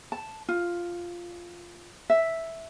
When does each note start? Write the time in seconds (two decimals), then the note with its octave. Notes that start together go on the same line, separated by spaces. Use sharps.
0.12 A5
0.49 F4
2.10 E5